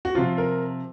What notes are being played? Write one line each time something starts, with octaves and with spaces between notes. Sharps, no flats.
F#4
C3 F3 F4
A#4